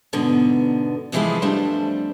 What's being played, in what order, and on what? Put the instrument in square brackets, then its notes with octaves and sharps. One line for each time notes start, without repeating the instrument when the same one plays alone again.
[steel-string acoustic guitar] G#2 B2 D3 B3
F2 C3 E3 F3 G#3 E4
F2 G3 A3 D4 C5